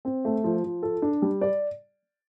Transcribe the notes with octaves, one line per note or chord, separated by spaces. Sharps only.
C4
A3
F3
F3
A4
D4
G3
D5